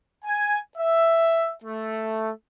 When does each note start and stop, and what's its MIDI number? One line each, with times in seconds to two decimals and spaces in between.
0.25 0.57 80
0.77 1.53 76
1.64 2.31 57